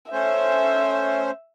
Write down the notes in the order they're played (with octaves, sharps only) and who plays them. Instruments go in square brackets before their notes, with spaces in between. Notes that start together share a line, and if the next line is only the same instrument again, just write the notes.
[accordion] A3 C#4 C5 [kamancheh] E5